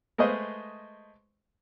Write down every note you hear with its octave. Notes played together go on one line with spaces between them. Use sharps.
G#3 A3 B4 C5 D#5 F5